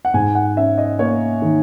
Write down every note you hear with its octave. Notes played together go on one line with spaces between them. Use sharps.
F#5
G#2 G#5
F#5
C#4 E5
D#5
A#3 C#5
D#3